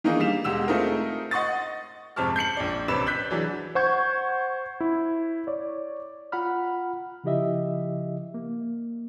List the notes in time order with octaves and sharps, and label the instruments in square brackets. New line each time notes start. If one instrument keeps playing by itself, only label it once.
[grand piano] D#3 E3 A#3 D4 D#4 G#4
G3 F5 E7
E1 G#3 G4 F#5 E6 E7
A3 C4 D#4 F4 G#4 A#4
D#5 F#5 C6 C#6 D#6 A6
D#5
[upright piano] F2 G#2 C3 A5 C#6 F6
G6 C7 C#7 F#7
A#1 D5
A1 C3 B4 E6 E7
F#6 G6 B6
E3 F#3 D4 G#4
[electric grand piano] C5 F#5 C#6 G6 G#6
E4
C#5 D5
[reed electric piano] F4 F#5 A#5 B5 F6
C#3 F3 E4 G4 D#5 E5
A#3